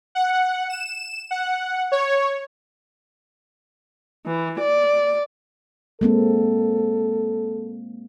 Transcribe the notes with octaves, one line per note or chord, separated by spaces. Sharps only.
F#5
E7
F#5
C#5
E3
D5
G#3 A#3 C4 A4